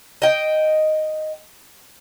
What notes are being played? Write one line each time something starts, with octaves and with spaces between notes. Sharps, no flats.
D#5 G5